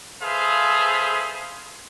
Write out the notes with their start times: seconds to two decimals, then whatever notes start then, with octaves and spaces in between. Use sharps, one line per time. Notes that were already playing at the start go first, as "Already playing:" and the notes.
0.22 G#4 A4 B4 C5 E5 F5